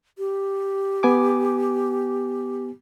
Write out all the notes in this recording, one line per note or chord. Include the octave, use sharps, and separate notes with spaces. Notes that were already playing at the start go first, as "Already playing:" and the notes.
G4
B3 G#5 D6